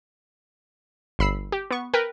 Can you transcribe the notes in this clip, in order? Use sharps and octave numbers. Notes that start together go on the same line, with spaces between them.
G1 B5 E6 C7
G4
B3 C#6
A#4 B4 G5